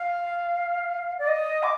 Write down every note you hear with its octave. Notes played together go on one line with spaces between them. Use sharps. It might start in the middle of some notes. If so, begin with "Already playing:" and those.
Already playing: F5
D5
D#5
D6